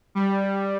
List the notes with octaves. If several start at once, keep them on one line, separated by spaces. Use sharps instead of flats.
G3